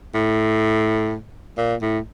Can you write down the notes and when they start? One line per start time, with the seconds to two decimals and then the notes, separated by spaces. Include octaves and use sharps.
0.14 A2
1.58 A#2
1.82 A2